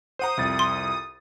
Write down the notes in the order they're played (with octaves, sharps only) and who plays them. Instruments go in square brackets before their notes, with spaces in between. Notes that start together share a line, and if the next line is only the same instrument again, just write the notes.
[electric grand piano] C5 F#5 A#5 [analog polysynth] D#6
[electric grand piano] C2 F2 A6
[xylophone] C6